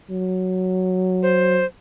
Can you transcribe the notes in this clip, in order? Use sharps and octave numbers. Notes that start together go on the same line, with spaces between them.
F#3
C5